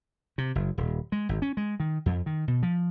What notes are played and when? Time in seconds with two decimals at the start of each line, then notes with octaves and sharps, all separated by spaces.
0.38 C3
0.55 F#1
0.78 D#1
1.12 G#3
1.29 G#1
1.42 C#4
1.57 G#3
1.80 D#3
2.06 F2
2.26 D#3
2.48 B2
2.63 F3